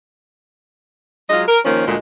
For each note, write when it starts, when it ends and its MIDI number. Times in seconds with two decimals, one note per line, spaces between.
1.30 1.43 54
1.30 1.43 56
1.30 1.43 65
1.30 1.43 75
1.48 1.59 70
1.65 1.84 51
1.65 1.84 53
1.65 1.84 58
1.65 1.84 61
1.87 1.97 38
1.87 1.97 46
1.87 1.97 56